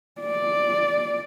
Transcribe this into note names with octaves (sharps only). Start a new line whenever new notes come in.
D5